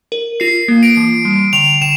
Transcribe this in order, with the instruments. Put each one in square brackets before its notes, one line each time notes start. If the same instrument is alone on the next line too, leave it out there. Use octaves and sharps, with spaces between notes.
[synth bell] A#4
[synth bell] F4 [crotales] C7
[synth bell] A#3
[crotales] D7
[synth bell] E3
G3
[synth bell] D3 [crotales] F7
[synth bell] D3 [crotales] E7